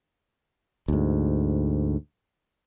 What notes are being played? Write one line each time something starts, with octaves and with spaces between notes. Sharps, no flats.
D2 G#2